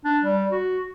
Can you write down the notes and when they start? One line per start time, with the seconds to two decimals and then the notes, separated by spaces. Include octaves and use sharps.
0.05 D4
0.24 G3
0.51 F#4